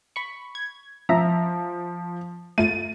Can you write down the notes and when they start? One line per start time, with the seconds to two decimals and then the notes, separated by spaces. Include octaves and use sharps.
0.16 B5 C#6
0.55 G#6
1.09 F3 E5 A#5
2.58 A3 F4 A6 D#7